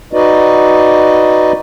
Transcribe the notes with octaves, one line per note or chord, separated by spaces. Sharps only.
D#4 F#4 B4 D5 D#5